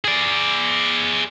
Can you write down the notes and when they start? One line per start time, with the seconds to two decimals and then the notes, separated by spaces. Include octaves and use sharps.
0.04 G#4 D5